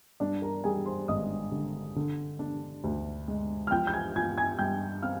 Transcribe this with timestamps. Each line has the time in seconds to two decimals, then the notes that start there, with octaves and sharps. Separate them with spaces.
0.20 G2 D4 D5
0.42 A#4 A#5
0.64 G3 G#4 G#5
0.86 C5 C6
1.08 G#1 D#5 D#6
1.52 D3
1.96 D3
2.39 D4
2.84 D2
3.28 G#3
3.67 F6
3.71 F3 G5 G6
3.87 G6
3.93 G#5 G#6
4.16 F4 G#5 G#6
4.38 G#5 G#6
4.59 G2 G5 G6
5.02 C4 F5 F6